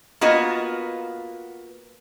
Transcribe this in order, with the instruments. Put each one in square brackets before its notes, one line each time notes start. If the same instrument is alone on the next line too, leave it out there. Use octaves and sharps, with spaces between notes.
[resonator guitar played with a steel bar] A#3 B3 F4 F#4 D#5